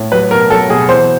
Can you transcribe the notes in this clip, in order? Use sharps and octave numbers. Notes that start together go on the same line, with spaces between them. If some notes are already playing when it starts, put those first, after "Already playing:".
Already playing: A2
F#3 B4
B2 A#4
F#3 A4
B2 G#4
E3 C5